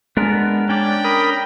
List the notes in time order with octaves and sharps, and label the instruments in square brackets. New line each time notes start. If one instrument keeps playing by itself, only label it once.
[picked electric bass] G#3 [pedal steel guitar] B3 D4 A#4
[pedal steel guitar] C#4 D4 D5 [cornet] G5
[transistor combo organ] A#4 B5 D#6